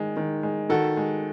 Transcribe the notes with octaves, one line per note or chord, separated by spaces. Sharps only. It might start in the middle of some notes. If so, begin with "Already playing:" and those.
Already playing: D#3 G#3
D#3
G#3
D#3 F#4 A4
G#3